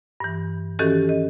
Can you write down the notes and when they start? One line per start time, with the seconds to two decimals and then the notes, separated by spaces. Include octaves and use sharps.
0.20 G2 E3
0.79 D#3 E3 C#4 F#4 G4 A4
1.09 D#5